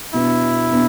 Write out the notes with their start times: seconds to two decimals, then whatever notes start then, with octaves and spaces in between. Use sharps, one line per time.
0.14 B2 B3 D4 E4
0.71 B2 B3 D4